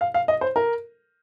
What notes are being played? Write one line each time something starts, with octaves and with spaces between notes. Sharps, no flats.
F5
F5
D#5
C5
A#4